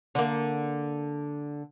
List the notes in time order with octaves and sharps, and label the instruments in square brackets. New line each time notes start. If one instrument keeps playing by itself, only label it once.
[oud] D3 A#3